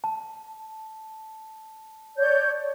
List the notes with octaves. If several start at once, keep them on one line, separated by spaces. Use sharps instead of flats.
A5
C#5 D5 G6